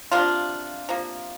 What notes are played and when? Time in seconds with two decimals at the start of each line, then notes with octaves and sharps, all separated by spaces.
0.11 C3 F3 A#3 D4 F4
0.89 C3 F3 A#3